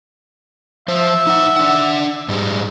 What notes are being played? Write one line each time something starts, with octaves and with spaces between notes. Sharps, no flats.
F3 C5 E5
D#4 F#5
D4 F#5
G#2 G3 G#3